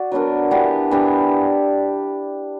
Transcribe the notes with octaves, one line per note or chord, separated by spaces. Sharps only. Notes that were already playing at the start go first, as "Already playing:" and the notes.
Already playing: F#4 D5
F#3 B3 D4 A#4
E3 B3 D4 G4
E3 B3 D4 G4